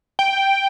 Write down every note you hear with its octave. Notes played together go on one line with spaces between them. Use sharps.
G5